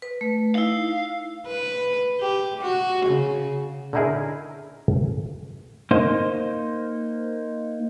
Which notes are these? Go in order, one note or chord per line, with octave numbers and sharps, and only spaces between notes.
B4
A3
D#4 E4 F5
B4
G4
F#4
C#3
D3 C#4 D#4 E4 G#4 A#4
A#3 D#4 C5